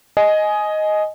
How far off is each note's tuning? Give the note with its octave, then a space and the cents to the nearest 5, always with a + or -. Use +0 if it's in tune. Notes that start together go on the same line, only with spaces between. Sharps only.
D#5 +0 G#5 +15